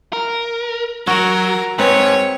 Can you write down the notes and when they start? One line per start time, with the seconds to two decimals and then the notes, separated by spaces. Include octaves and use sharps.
0.13 A#4
1.07 F#3 F#4 A#4
1.78 G#2 C4 B4 C#5